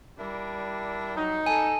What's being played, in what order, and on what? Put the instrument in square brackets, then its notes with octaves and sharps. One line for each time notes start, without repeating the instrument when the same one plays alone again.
[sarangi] G3 [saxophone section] D4 E4 A#4
[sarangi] F#3 [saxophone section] D#4
[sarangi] A4 [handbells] G#5